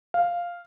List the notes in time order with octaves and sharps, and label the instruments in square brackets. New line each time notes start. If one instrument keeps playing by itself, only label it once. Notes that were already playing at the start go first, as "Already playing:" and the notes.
[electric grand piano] F5